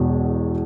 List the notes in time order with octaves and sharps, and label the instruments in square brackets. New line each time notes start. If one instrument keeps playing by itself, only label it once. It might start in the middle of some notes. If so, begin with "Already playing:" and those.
Already playing: [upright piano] E1 E2 B2